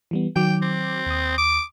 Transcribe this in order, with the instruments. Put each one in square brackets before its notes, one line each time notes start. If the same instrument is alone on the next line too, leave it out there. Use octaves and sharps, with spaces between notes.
[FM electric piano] E3 G3 B3
[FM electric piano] D#3 F#3 D6 [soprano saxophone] G5
[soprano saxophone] C4
[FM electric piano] D#2 D#6
[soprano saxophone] D6